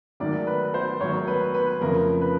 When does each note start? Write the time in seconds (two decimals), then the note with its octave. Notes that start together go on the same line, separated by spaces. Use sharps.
0.20 G#2 D#3 F#3 A3 D5
0.47 B4
0.74 C5
1.00 G#2 D#3 F#3 A3 C#5
1.28 B4
1.54 B4
1.81 F2 C#3 F3 A3 A#4
2.21 B4